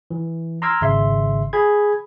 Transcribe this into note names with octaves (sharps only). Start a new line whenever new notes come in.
E3
A#5 C6 D6 E6 F6 G#6
G#1 C#3 E5 C6
G#4 B5 G#6